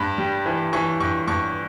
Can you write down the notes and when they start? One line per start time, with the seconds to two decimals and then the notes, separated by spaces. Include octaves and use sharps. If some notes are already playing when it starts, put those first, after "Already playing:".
Already playing: G2 B5
0.18 G3
0.46 E3
0.73 E3 C#6
1.00 G2 C#6
1.28 G2 C#6